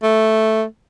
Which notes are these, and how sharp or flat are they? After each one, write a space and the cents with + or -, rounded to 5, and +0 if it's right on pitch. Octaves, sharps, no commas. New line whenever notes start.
A3 +0